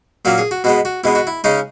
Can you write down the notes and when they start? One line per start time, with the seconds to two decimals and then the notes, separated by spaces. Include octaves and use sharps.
0.25 A#2 F#3 A#3 C#4 F#4
0.38 G#4
0.51 F#4
0.64 B2 G#3 B3 F#4
0.85 F#4
1.04 B2 G#3 B3 E4
1.15 F#4
1.27 E4
1.44 C#3 G#3 C#4 D#4